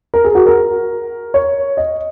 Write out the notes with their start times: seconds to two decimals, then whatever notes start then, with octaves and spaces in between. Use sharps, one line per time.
0.14 A#4
0.24 G#4
0.35 F#4
0.46 A#4
1.34 C#5
1.77 D#5